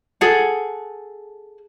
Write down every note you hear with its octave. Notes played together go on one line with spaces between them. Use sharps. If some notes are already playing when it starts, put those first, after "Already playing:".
G#4 A4 F#5